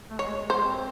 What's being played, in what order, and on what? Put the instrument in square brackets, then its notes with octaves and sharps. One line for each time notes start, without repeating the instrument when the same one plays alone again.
[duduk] A3
[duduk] G#3 [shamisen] C#5
[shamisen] C5
[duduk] C4